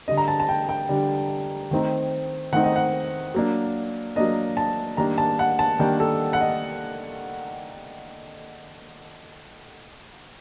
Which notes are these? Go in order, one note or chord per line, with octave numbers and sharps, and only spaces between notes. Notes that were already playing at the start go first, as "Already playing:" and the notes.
D3 G3 D4 D#5
A#5
A5
A5
G5
G5
D3 G3 D4
D#3 A3 C4 D#4
D#3 A3 C4 D#4 F#5
D#5
F#5
F#3 A#3 D4
F#3 A#3 D4 D#5
A5
D#3 G3 A#3 D4 A#5
A5
F#5
A5
D#3 G3 A#3 D4 G5
A4
F#5
D#5